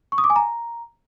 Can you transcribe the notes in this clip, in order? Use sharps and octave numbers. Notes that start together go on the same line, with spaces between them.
C#6
D#6
D6
G#5
A#5